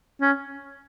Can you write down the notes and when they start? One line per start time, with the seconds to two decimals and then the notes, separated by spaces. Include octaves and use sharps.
0.21 C#4